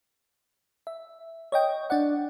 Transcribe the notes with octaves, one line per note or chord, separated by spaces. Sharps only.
E5
C#5 D#5 G5
D4 D5 F#5